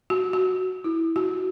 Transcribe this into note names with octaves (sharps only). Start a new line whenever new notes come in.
F#4
F#4
E4
F#4